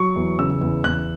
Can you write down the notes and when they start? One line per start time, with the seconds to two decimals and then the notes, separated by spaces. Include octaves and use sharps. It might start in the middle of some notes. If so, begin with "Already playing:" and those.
Already playing: F#3 C#6
0.16 E2
0.39 C#3 E6
0.61 E2
0.84 E2 F#6